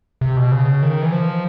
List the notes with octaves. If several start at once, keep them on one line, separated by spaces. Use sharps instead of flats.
C3
B2
C#3
D#3
E3
F3